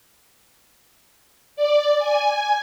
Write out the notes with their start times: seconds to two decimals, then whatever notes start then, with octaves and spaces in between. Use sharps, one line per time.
1.56 D5
1.99 G#5